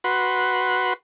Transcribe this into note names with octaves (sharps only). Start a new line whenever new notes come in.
F#4 B4 C6